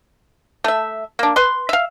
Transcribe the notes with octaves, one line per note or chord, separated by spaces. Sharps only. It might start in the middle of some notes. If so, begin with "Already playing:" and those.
A3 E5
A#3 D4
B4 C6
E5 F5